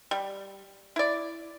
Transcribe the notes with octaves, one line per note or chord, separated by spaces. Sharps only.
G3
E4 D5